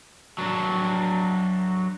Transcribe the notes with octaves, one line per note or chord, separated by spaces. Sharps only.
F#3 D4